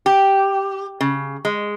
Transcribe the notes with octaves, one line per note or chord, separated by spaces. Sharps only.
G4
C#3
G#3